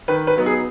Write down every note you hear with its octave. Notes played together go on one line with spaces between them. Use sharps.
D#3 B4
B4
F#3 B3 D#4
G#4